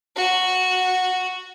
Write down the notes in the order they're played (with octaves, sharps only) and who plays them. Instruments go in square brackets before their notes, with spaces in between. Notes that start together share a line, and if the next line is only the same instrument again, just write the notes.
[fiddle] F#4